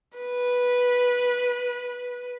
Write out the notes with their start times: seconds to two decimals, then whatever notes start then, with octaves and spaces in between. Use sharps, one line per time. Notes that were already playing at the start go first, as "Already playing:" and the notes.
0.17 B4